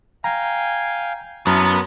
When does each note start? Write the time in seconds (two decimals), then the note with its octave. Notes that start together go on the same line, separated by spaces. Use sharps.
0.24 F5 G5 G#5 A#5
1.47 F#2 B3 E4 A#4 A5 A#5 F6